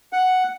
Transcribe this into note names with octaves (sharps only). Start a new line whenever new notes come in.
F#5